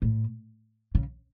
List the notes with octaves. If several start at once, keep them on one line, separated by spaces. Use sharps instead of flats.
A2
C#3